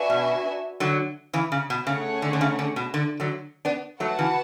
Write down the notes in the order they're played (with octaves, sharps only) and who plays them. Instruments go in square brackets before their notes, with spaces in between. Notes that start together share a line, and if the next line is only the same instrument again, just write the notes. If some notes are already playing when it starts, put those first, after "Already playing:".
Already playing: [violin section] D4 F#4 B4 E5 G#5
[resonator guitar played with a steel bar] B2
D3 F#3
C#3 E3
C#3
B2
[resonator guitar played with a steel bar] C#3 [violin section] A3 C#4 G#4 C#5 F#5
[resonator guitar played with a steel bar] D3
D3
C#3
D3
B2
D3
D3 F#3
B3 D4
[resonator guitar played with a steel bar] F#3 A3 [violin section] F#4 B4 F#5 A5
[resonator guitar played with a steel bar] C#3 E3